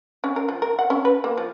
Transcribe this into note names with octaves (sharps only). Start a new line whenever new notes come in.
C#4
A#4
F3
A#4
F#5
C#4
B4
A#3
F3